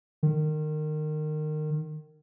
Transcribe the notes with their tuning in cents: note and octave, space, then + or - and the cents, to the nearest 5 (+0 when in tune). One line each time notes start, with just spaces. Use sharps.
D#3 -25